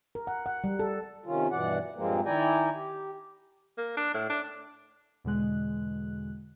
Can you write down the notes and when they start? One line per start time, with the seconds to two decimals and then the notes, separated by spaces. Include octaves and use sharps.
0.15 A#4
0.27 F#5
0.46 F#5
0.64 G3
0.79 A4
1.26 C3 D#3 C#4 F4
1.52 G2 B2 E3 D5 F#5
1.96 G2 A#2 F3 G#3 A#3 C4
2.25 D#3 E4 D5 G5 G#5 A#5
2.74 G4
3.77 A#3
3.97 D4
4.14 A2
4.29 D4
5.24 E2 B2 D3 G#3 F#6